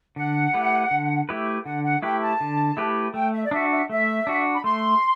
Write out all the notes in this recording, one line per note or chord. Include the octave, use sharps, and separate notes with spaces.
D3 F#5
A3 E4 G4 B4
D3
A3 E4 G4 B4
D3 F#5
F#5
A3 E4 G4 B4 G5
A5
D3
A3 E4 G4 B4
A3 G5
E5
D5
D4 F#4 E5
E5
A3 E5
D4 F#4
B5
A3 C6